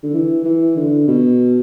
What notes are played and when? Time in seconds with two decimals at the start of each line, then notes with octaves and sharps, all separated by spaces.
0.03 D3
0.13 E3
0.45 E3
0.76 D3
1.08 B2